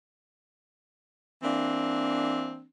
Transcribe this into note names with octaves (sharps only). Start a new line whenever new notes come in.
E3 A#3 C4 D4